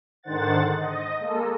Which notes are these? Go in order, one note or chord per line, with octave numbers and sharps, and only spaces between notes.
G#2 D3 D#3 C5 F#5 A6
D#5
G#3 A#3 A4